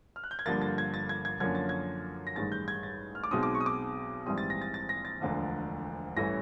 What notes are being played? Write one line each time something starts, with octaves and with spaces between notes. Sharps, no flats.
F6
F#6
G6
G#6
G1 G2 D3 F3 A#3 A6
A6
G#6
A6
G#6
G#6
F#2 D3 F3 A#3 C#4 G#6
A6
G#6
A#6
A1 G2 D#3 G#3 A6
G6
G#6
A6
F6
D6
B1 B2 G#3 C4 D#4 D#6
D6
C#6
D#6
D6
A#1 G#2 E3 G3 C4 D#6
A6
A#6
A6
A6
A#6
A6
E1 D2 D3 F3
A1 G2 E3 A3 C#4 A#6